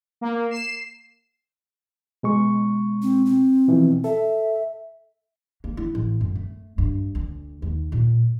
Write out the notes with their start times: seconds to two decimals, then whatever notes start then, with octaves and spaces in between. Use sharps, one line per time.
0.21 A#3
0.51 C7 E7
2.23 B2 G#3 C#6
3.02 C4
3.26 C4
3.68 B2 E3 F3
4.04 A4 E5
5.64 A#3
5.77 E4
5.95 A1
6.21 F#2
6.35 A3
6.78 G2
7.15 D2
7.62 D#2
7.92 A#2